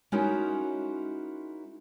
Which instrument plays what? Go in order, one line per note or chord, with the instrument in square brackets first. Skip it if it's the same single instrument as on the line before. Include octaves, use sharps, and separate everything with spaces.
[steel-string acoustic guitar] G#3 C#4 D#4 E4 F#4 A#4